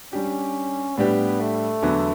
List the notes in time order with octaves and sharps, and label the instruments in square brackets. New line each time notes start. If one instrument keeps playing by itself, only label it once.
[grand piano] G3 D4 G4 [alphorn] C#4
[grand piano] A2 G3 D4 G4 B4 [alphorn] B3
[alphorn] A3
[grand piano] E2 D3 F#3 B3